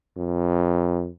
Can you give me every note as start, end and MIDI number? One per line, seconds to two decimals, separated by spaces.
0.17 1.09 41